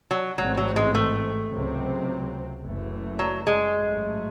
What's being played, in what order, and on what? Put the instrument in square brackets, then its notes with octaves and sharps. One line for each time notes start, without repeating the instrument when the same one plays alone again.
[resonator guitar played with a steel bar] F#3
[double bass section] A1 G#2 E3 C4 [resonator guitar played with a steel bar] F#3
[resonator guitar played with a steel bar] F#3
G#3
A3
[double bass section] C#2 C3 F#3 C4
F#1 F#2 E3 A3
[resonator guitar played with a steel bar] F#3
G#3
[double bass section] A1 G#2 F#3 A3